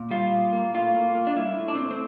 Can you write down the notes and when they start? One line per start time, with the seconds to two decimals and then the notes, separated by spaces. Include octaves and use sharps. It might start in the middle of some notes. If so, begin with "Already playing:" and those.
Already playing: A#2
0.11 G3 F4
0.32 A#2
0.52 A#3
0.74 A2 F4
0.94 A#3
1.15 A#3
1.27 D4
1.37 G3 E4
1.58 A2
1.68 D4
1.75 C4
1.78 A2
1.91 C4